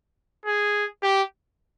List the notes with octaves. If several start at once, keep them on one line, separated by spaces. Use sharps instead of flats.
G#4
G4